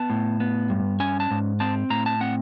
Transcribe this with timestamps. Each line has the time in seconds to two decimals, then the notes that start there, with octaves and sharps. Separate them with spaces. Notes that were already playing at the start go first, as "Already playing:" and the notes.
Already playing: B3 A5
0.10 A2
0.40 B3
0.70 G2
1.00 C#4 G#5
1.20 A5
1.31 G#2
1.60 C4 A5
1.90 A2 A#5
2.06 A5
2.21 C4 F#5